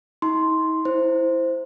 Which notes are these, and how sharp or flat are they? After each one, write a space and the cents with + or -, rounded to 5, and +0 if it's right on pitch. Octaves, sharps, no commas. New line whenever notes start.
D#4 +45 C6 +0
E4 +0 C5 +0